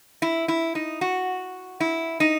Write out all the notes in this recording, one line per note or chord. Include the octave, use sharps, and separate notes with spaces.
E4
E4
D#4
F#4
E4
D#4